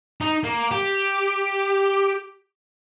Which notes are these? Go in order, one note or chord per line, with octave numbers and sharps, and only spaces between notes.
D#4
A#3
G4